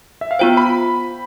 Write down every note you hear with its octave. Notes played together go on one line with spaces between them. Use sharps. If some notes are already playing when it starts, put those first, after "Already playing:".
E5
F5
B3 F4 C5 G5
B5